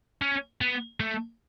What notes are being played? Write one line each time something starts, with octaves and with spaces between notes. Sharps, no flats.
C#4
B3
A3